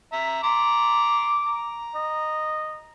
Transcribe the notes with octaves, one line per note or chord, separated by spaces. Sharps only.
E5 A#5
A#5 C6 D6
A#5
D#5